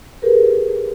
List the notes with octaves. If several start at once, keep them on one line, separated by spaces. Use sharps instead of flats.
G4 G#4 A#4 B4